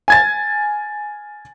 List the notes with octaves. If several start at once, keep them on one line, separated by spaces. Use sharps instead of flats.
G#5 G#6 A6